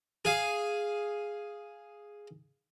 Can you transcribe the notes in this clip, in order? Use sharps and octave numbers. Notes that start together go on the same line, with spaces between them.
G#4 F5